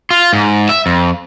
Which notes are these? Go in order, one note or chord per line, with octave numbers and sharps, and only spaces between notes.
F4
G#2
E5
F2